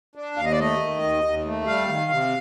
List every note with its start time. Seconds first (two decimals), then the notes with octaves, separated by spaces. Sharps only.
0.15 D4
0.37 D#2 F5
0.45 D#5
0.52 D5
0.59 A3 D#5
0.80 D#3
1.03 D#2
1.25 D#2
1.46 A3
1.67 G3 F5
1.89 D#3
2.12 C3